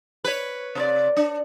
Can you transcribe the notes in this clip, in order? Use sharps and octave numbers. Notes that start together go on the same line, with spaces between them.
B4 C#5
C3 A#4 D5
D4